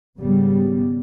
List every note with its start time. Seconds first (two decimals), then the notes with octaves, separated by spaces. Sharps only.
0.18 G#1 C#3 G3 B3